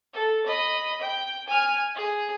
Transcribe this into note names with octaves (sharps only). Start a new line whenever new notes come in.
A4
D#5 B5
G5
G#5 F6
G#4